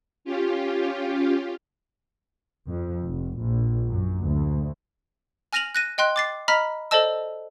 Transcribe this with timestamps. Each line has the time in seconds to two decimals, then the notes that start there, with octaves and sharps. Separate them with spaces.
0.25 C#4 F4 G4
2.68 F2
3.04 F1
3.37 A#1
3.90 F#2
4.24 D2
5.53 G#5 F6 A#6 D#7 F7 F#7
5.75 F#6 A#6 D#7
5.98 D#5 G5 C6 F#6
6.16 D6 A6 C7
6.48 D#5 A#5 B5 F6 B6
6.91 A4 C5 D5 D#5 A5 E6